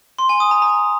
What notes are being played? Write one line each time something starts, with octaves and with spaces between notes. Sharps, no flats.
C6
G#5
D#6
A#5
A#5